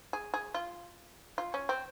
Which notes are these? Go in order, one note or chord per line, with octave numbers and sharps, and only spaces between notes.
G#4
G#4
F4
F4
C#4
C4